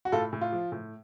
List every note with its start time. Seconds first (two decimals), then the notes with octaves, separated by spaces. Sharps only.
0.05 F#4
0.12 A2 F4 A4
0.33 A2
0.41 F4
0.52 F3
0.72 A2